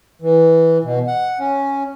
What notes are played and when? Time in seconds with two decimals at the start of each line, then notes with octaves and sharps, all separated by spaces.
0.22 E3
0.84 B2
1.08 F#5
1.39 C#4